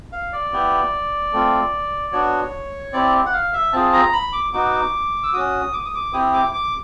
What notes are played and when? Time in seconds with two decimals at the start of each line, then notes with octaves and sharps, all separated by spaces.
0.12 F5
0.33 D5
0.52 B3 E4 G4
1.33 A3 C4 F4
2.12 B3 D4 F#4 C#5
2.93 C4 E4 G4 D5
3.26 F#5
3.33 F5
3.53 E5
3.73 C4 F4 G#4 A5
3.93 A#5
4.13 B5
4.33 D6
4.53 B3 D#4 F#4 D6
5.23 E6
5.33 C#4 F#4 D#6
5.73 D6
5.85 D#6
5.95 D6
6.13 C4 E4 G4 D#6
6.33 D6
6.53 D6